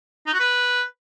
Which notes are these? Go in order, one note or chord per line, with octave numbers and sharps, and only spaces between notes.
D#4
F#4
B4